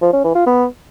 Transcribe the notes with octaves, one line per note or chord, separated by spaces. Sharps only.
F3
C#4
E3
F4
B3